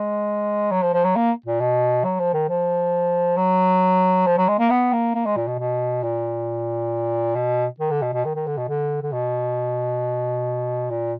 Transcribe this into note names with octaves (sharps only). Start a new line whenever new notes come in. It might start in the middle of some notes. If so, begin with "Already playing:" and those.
Already playing: G#3
F#3
F3
F3
F#3
A#3
A#2
B2
F#3
F3
D#3
F3
F#3
F3
F#3
G#3
A#3
B3
A#3
A#3
G#3
A#2
B2
B2
A#2
B2
D#3
D3
B2
B2
D#3
D#3
D3
B2
D3
D3
B2
A#2